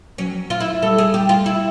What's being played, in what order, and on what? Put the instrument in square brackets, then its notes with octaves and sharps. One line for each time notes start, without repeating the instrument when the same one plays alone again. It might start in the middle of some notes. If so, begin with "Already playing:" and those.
[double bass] F#3 [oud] C#4
[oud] F4
E4
[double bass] G3 [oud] A4
[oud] G#4
G4
F4
E4